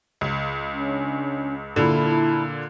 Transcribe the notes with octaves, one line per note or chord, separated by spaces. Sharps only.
C#2
C#4 D4
A#2 D3 E4 A5 B5